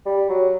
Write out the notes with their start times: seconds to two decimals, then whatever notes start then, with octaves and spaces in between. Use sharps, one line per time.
0.06 G3
0.29 F#3